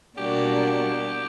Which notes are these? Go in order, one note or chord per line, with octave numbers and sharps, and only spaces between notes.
B2 G3 A#3 D4 F#4 G4